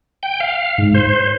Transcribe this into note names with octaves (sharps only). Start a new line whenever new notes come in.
G5
F5
G#2
C5